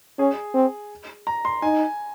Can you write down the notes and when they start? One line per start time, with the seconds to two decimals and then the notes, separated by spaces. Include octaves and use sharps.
0.19 C#4 G#4
0.54 C4
1.27 A#5
1.45 C6
1.62 D#4 G#5